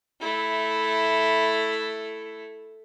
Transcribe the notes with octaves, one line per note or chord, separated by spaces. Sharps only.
A3 E4